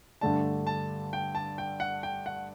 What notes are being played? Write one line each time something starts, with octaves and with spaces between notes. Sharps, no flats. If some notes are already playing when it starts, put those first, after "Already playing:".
G2 D3 A3 D4 A5
A5
G5
A5
G5
F#5
G5
F#5